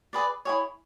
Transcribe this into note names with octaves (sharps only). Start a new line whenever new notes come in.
G#4 B4 D5
E4 G#4 C#5